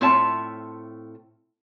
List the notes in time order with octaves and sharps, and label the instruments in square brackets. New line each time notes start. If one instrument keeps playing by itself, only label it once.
[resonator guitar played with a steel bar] A2 C4 F4 C#5 E5 A5